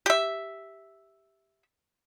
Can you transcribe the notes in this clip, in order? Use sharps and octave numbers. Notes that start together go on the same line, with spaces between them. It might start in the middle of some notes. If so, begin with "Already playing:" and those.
G4 E5